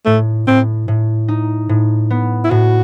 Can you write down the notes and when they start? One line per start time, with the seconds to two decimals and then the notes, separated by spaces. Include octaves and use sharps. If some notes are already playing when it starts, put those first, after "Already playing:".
0.06 A2 A3
0.47 A2 C4
0.88 A2
1.28 D#4
1.69 A2
2.10 B3
2.44 E4
2.51 A2 F#4